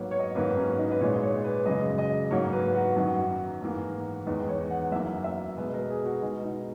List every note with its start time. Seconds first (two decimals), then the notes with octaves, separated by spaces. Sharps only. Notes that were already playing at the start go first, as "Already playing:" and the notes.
Already playing: G#2 F#3 A#3 B4 C#5
0.11 C#5
0.19 D#5
0.35 G#2 D#3 F#3 A#3 B4
0.57 C#4
0.79 D#4
0.91 B4
1.01 A#2 G#3 C#5
1.23 C#5
1.44 B4
1.66 F#2 C#3 G#3 D#5
1.98 D#5
2.31 G#2 F#3 A#3 C#5
2.53 B4
2.75 F#4
2.96 F#2 D#3 F#3
3.61 G#2 E3 A#3
4.27 E2 D#3 G#3 B4
4.48 C#5
4.70 F#5
4.92 F#2 E3 A#3 E5
5.24 E5
5.57 B2 G#3 B4
5.73 A#4
5.90 G#4
6.05 F#4
6.22 B2 G#3 D#4
6.44 D#4